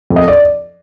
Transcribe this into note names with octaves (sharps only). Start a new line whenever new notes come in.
F2
D#5
D5